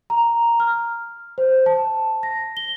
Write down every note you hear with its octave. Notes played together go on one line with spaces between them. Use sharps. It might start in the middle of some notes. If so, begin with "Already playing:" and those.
A#5
F6
C5
A5
A#6
G7